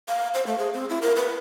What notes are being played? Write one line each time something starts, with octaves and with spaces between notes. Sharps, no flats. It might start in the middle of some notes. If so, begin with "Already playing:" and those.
F5
C5
A3
G#4
C4
E4
A#4
B4